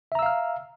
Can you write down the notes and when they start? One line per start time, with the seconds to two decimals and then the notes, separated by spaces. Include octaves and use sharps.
0.12 E5
0.15 A#5
0.19 E6
0.22 F5
0.26 F6